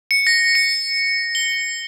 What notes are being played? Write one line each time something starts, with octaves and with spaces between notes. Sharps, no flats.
C#7
A#6
C#7
G7